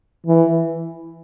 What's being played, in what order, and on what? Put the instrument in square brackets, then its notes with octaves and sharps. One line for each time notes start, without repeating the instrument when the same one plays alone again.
[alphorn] E3